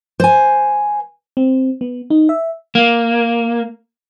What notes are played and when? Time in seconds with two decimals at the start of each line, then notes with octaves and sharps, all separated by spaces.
0.20 C5 G#5
1.37 C4
1.81 B3
2.10 D#4
2.29 E5
2.75 A#3